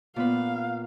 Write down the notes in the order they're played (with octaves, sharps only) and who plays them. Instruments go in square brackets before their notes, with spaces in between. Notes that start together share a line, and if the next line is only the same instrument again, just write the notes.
[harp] A#2 B3 B4 [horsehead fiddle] F5